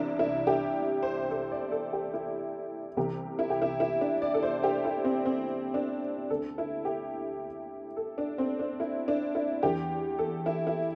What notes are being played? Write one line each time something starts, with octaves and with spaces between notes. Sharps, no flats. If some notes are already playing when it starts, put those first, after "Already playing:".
Already playing: C2 C3 E3 D4 E4
E4
G4
C5
A4
D5
A4
G4
E4
C2 C3 E3 G4
E4
G4
E4
E4
D4
D5
A4
C5
G4
E4
C4
C4
D4
D2 D3 A4
E4
G4
A4
D4
C4
D4
E4
D4
E4
E2 E3 G4
A4
E4
E4